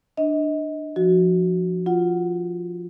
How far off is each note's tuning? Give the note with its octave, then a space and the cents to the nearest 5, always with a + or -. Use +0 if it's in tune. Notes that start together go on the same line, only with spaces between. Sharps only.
D4 +20 D#5 +25
F3 +0 F#4 +0
F4 +0 F#5 +0